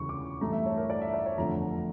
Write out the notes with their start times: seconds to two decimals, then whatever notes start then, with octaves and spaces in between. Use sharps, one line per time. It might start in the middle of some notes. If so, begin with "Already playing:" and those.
Already playing: E1 D2 C#3 E3 G3 C#6
0.09 D6
0.41 A1 G2 E3 A3 A#5
0.53 E5
0.66 C#5
0.77 A#4
0.90 D5
1.02 E5
1.14 D5
1.26 C#5
1.38 F1 E2 D3 F3 A3 A#5